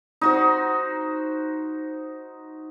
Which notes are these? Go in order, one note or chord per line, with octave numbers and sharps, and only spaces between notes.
D#4 F#4 C5